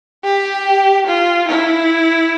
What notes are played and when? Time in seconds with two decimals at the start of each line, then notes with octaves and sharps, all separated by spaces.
0.25 G4
1.07 F4
1.48 E4